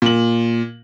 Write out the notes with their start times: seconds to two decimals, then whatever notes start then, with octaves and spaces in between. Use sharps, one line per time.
0.02 A#2 F#7